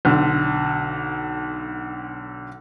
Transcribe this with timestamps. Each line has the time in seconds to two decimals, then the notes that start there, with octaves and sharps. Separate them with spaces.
0.05 B1 D3